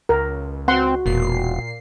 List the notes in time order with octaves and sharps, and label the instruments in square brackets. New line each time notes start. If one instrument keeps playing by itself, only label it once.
[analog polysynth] C#2 [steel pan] A#4
[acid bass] C4 [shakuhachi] F#4 [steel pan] F#5 C6
[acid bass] E1 [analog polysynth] A#2 C7